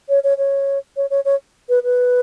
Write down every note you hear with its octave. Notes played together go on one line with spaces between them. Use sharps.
C#5
C#5
C#5
C#5
C#5
C#5
B4
B4